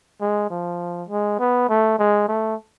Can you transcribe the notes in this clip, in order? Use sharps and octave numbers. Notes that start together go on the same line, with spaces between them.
G#3
F3
G#3
B3
A3
G#3
A3